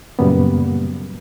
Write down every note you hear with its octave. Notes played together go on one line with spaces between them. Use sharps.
F#2 A#2 C#3 G3 A#3 B3